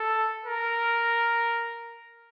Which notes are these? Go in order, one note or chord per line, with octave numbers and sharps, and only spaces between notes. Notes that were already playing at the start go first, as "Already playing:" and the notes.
Already playing: A4
A#4